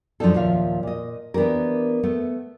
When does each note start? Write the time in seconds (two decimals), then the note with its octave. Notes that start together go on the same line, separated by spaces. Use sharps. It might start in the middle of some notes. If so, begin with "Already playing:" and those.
0.20 F#2 F3 A3 D4 D#4 A4
0.34 D#2 A#2 F3 F4 E5 F5
0.83 A#2 D#5
1.34 E3 B3 D4 G4 A#4
2.03 A3 B3